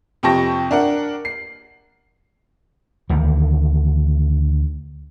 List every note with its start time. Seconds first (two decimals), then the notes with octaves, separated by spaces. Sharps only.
0.23 F2 C3 G5 A5 C#6 A#6
0.71 D4 A#4 F#5
1.25 C7
3.09 D2 D#3 E3